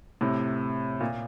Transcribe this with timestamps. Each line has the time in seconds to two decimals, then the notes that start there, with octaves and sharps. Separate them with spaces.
0.21 A2 C3
1.00 A#2